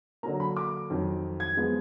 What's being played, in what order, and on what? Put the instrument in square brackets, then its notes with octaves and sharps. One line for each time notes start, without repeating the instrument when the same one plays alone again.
[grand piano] D3 F#3 A#3 A#5
B5
D6
F2 D#3 F#3
G#6
F3 G#3 B3